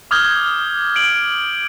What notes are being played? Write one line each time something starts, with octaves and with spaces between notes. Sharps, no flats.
D6 D#6 F6 G6 G#6 G7
D7 F#7